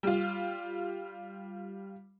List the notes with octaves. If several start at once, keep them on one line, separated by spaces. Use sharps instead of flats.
G3 F4